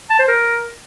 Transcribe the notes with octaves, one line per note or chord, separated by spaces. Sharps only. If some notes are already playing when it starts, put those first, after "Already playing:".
A5
C5
A#4